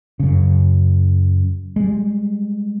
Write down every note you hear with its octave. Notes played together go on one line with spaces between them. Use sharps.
F#2 C#3
G3 G#3